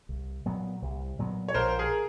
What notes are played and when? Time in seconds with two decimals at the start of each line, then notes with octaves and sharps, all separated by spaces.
0.09 C2
0.45 A#2 F#3 B3
0.82 C2
1.19 A#2 F#3 B3
1.48 C#5
1.54 A#1 A#4 C5
1.79 G#4 A#4